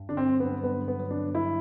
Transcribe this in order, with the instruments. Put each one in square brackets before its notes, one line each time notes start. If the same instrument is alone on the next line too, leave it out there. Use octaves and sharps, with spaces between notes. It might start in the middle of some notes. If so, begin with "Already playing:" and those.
Already playing: [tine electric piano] G2
[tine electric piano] D3 [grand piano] D4
[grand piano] C4
[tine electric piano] F#3
[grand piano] B3
[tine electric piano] G2
[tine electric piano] G2 [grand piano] B3
[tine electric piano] D3
[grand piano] B3
[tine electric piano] F#3
[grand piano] D4
[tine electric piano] G2
[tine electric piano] G2 [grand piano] E4